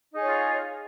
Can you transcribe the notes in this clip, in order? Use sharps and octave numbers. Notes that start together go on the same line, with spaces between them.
D#4 F4 G#4 C#5